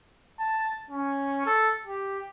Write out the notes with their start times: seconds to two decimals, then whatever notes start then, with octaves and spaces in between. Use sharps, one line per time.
0.39 A5
0.91 C#4
1.46 A4
1.86 G4